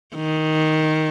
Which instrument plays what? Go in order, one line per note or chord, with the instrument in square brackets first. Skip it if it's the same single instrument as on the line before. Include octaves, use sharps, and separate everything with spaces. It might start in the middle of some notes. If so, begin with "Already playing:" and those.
[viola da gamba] D#3